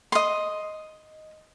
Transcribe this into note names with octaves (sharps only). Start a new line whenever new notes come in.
D#5 C6